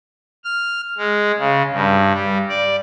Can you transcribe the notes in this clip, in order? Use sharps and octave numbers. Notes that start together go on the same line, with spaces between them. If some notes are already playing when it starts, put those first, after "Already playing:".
F6
G#3
C#3
G2
G3
D5